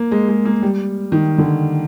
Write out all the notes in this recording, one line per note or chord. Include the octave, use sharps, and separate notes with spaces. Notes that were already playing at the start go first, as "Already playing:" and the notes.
Already playing: A#3
G#3
G#3
A#3
G3
D#3
D3